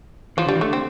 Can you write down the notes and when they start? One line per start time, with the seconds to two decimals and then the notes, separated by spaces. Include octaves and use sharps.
0.37 E3 F3
0.46 D3 G3
0.55 E3
0.61 D3 A3
0.73 C4